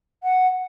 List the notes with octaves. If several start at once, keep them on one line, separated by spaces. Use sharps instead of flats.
F#5